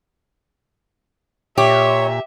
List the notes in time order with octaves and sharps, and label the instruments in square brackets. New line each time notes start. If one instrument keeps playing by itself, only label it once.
[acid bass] A#2 [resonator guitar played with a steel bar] G4 [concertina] C#5 [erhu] E5